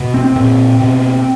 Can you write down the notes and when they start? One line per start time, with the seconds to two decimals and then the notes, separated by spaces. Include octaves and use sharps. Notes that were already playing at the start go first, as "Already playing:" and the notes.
Already playing: B2
0.14 C4
0.24 C4
0.36 A#2
0.80 B2